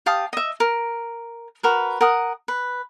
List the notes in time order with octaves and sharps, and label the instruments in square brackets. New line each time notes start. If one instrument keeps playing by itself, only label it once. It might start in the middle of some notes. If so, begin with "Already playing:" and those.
[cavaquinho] G4 F5 A5 D#6
D#5 E5
A#4
F#4 A#4 B4
A#4 F#5 D#6
B4